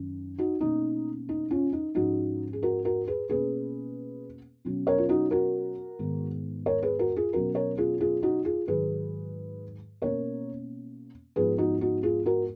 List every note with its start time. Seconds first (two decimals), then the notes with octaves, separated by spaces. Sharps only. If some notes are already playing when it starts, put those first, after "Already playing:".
Already playing: F#2 D#3 C#4
0.38 D#4 F#4
0.61 B2 A#3 C#4 D#4
1.29 D#4
1.51 C#4 F4
1.73 D#4
1.95 G#2 F3 G#3 C#4 D#4 F#4
2.53 G#4
2.63 F#4 A#4
2.85 F#4 A#4
3.07 G#4 B4
3.30 B2 A#3 C#4 G#4 B4
4.65 B2 F#3 C#4
4.87 A#4 C#5
4.98 F4
5.09 D#4 F#4
5.31 F#4 A#4
5.99 G#2 D#3 G#3 B3
6.66 A#4 C#5
6.82 G#4 B4
6.99 F#4 A#4
7.16 F4 G#4
7.33 B2 F#3 C#4 F#4 A#4
7.55 A#4 C#5
7.77 F4 G#4
8.01 F4 G#4
8.23 D#4 F#4
8.45 F4 G#4
8.67 G#2 D#3 F#3 G#4 B4
10.02 B2 A#3 C#4 A#4 C#5
11.36 G#2 F3 B3 G#4 B4
11.58 D#4 F#4
11.81 D#4 F#4
12.03 F4 G#4
12.26 F#4 A#4